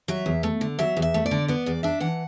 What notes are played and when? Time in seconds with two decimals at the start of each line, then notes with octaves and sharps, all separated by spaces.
0.08 F#3 E5
0.26 E2
0.43 A3
0.61 D3
0.79 F#3 E5
0.97 E2
1.02 E5
1.14 A3
1.26 D5
1.31 D3
1.48 B3 D5
1.66 E2 D5
1.83 D4 E5
2.00 E3 F#5